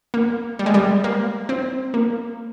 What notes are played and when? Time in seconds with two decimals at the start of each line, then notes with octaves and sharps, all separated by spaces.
0.14 A#3
0.59 G3
0.66 G#3
0.74 G3
1.04 A#3
1.49 C4
1.94 A#3